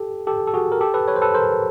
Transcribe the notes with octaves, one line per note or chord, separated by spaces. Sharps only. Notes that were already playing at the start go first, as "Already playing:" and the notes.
Already playing: G4 A4
G4 A4
A4
F#4 G#4
A#4
G4 A4
A4 B4
B4 C#5
C5
A4 B4
A#4 C5